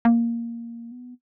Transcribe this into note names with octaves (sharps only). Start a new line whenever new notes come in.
A#3
B3